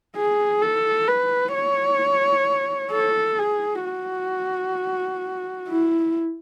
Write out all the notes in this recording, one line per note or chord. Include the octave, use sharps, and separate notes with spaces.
G#4
A4
B4
C#5
A4
G#4
F#4
E4